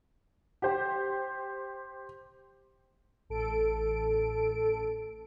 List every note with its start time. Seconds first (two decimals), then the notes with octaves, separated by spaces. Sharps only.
0.62 G4 C5
3.29 A1 A4 D7